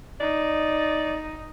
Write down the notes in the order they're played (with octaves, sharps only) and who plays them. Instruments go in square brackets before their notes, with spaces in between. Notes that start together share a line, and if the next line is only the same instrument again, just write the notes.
[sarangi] D#4 [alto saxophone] D5